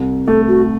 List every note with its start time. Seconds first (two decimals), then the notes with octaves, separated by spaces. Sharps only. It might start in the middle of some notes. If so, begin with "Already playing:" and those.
Already playing: C2
0.27 A3 A4
0.48 F#4